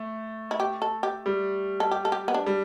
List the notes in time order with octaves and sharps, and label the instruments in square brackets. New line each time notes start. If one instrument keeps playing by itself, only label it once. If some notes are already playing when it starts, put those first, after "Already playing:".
Already playing: [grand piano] A3
[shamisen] E4
G4
A4
G4
[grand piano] G3
[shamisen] A4
G4
A4
G4
B3
D4
[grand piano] G3